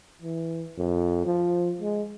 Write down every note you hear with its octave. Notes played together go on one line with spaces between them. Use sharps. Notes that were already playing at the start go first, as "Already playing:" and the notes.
E3
F2
F3
G#3